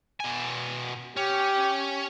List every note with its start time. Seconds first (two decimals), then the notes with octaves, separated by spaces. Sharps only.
0.20 B2 G#5
1.17 C#4 G4